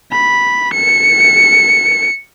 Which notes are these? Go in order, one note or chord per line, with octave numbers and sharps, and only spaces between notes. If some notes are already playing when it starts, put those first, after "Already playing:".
B5
C#7